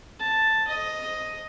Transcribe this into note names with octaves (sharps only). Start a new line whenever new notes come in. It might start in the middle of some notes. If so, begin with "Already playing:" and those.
A5
D#5